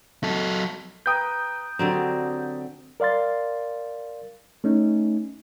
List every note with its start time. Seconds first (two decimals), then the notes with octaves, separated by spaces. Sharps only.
0.23 F#3 A4
1.06 B4 G5 A#5 D#6 G6
1.79 D3 F#3 C4 G4 D5 A#5
3.00 A#4 D5 F5 C6 A6
4.64 A3 C#4 D#4